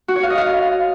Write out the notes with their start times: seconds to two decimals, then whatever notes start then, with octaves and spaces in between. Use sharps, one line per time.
0.08 F#4
0.16 C#5
0.23 F5
0.30 D#5
0.37 F5